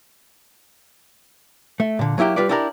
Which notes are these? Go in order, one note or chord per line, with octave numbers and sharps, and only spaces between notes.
A3
A#2 D3
F#3 A#3 E4 G4 G5
G3 F4 B4 D5
D4 E4 G4 A4 A#4 D5